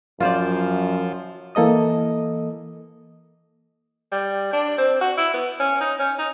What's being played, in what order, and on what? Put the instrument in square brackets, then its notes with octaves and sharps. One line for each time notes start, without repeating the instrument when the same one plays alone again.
[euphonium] F#2 [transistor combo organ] F3 [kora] F4 C5 D5
[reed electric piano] E3 A#3 A4 D#5 D#6
[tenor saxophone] G3
D4
C4
F#4
E4
B3
C#4
D#4
C#4
D#4